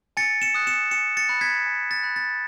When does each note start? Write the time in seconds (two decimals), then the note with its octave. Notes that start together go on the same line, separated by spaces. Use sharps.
0.17 G#5 A6 C#7
0.42 C#7 E7
0.54 D#6 F#6
0.67 C#7 E7
0.91 G#5 C#7 E7
1.17 A6 C#7
1.29 B5 F#6
1.41 G#6 B6
1.66 G#5
1.91 A6
2.03 B5 F#6
2.16 A6